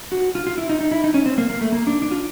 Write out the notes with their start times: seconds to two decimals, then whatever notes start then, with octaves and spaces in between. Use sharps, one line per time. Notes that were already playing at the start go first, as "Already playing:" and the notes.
0.12 F#4
0.35 F4
0.47 F4
0.58 E4
0.69 D#4
0.81 D#4
0.91 E4
1.04 D#4
1.14 C#4
1.26 C4
1.38 A#3
1.50 A#3
1.61 A3
1.72 A#3
1.87 D4
2.02 D4
2.11 F4